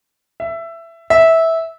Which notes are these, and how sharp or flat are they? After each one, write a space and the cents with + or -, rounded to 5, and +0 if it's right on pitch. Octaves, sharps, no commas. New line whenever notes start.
E5 +15
E5 -15